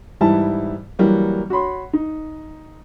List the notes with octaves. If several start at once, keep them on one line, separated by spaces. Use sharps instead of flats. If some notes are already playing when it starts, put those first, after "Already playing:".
G#2 E3 G3 E4 A5
E3 F#3 G3 A#3
F#4 C#5 B5 C6
D#4